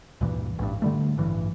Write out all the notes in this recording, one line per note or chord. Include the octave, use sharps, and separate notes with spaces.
D2 G2 A#2 E3
A1 G2
D3 G3 A3
A1 G2 E3